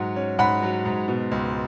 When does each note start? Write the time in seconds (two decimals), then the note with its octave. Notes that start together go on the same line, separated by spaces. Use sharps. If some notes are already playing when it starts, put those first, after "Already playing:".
Already playing: G#2 F#3 F#5
0.16 C#4
0.39 G#2 F#5 B5
0.62 F#3
0.85 G#2
1.08 B2
1.31 C#2